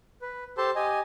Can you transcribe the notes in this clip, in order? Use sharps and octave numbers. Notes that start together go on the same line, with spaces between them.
B4
G4 A4 C5 A5 C6
G4 D#5 G#5